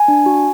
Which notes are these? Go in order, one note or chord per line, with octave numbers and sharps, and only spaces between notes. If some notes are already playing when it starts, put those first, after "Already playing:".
Already playing: G#5
D4
F#4